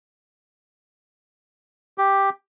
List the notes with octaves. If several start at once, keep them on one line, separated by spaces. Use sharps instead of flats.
G4